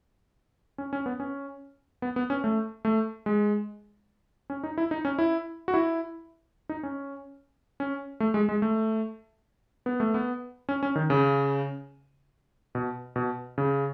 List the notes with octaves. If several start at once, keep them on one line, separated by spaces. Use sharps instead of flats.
C#4
C#4
B3
C#4
B3
B3
C#4
A3
A3
G#3
C#4
D#4
E4
D#4
C#4
E4
F#4
E4
D#4
C#4
C#4
A3
G#3
G#3
A3
B3
A3
B3
C#4
C#4
D#3
C#3
B2
B2
C#3